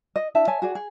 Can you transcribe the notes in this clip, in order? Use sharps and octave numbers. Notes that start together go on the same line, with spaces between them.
D#5
D4 E4 E5 A5
C#5 E5 G#5 A5
F#4 G#4 D5
G#4